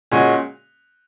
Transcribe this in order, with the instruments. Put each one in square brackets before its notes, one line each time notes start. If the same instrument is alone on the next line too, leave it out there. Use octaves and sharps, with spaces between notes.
[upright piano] A#2 G#3 C#4 F#4